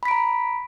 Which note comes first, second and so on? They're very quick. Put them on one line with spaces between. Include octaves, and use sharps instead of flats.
B5 B6 D7 A#5